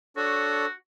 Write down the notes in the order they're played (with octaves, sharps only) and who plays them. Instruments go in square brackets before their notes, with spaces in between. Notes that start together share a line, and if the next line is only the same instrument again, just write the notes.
[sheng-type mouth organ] D4 A4 C#5 [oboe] F#4